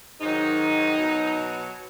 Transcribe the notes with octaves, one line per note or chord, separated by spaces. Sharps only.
G#2 D#3 F#3 D#4
B2 F#3